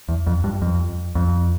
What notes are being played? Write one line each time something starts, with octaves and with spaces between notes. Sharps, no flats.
E2
F2
G2
F2
F2